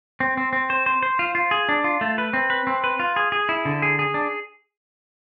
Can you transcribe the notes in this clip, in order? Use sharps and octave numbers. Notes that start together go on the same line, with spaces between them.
C4
C4
C4
C5
C5
C5
F4
F4
G#4
D4
F4
A3
B4
C4
B4
C4
B4
F4
G#4
G#4
E4
D3
G#4
G#4
D4